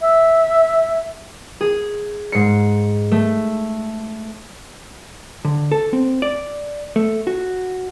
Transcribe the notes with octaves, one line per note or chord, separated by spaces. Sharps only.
E5
G#4
G#2 C7 C#7
A3
D3
A4
C4
D5
A3
F#4